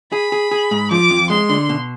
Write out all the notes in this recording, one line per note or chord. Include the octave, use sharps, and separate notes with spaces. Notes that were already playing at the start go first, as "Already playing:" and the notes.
G#4 B5
G#4
G#4
G#2
F3 D6
F2
G#3 C6
D3
B2